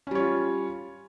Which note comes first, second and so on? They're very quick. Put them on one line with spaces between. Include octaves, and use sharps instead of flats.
C#4 G3 C#5 F4